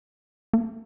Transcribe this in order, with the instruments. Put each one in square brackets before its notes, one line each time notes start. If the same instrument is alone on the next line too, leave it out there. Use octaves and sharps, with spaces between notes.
[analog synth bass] A#3